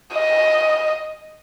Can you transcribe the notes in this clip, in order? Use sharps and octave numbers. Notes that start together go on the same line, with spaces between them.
D#5